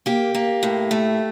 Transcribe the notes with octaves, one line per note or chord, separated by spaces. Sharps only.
A#3 G4
A#3
A2
A3